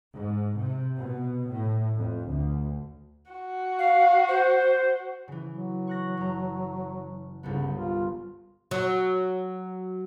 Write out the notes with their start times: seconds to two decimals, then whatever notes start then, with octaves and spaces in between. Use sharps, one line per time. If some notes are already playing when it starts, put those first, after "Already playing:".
0.14 G#2
0.59 C3
0.97 B2
1.51 A2
1.98 F2
2.29 D2
3.32 F#4
3.79 F5
4.29 C5
5.28 C#3 E3
5.50 F#3
5.87 C#6 F#6 A#6
6.17 F#1 A#5
7.43 G1 C2 C#3 B3
7.74 F4
8.71 F#3